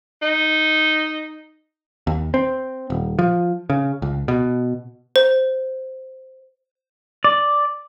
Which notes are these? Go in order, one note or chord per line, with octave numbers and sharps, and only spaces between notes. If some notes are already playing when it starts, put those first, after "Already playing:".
D#4
D#2
C4
D#1
F3
C#3
C#2
B2
C5
D5